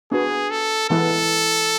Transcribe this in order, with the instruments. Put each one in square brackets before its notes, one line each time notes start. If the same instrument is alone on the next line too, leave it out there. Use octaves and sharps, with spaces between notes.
[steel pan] B3 D4 F#4 B4 [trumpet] G#4
[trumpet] A4
[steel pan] E3 G#3 B3 E4 B4 [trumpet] A4